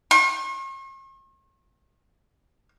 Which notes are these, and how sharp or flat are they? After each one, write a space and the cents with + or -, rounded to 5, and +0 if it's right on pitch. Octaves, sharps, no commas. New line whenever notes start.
C#6 -45